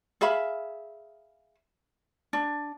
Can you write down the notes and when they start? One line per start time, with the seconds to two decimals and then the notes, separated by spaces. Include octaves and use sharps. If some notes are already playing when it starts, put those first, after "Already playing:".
0.21 G#4 E5 F5 B5
2.33 D4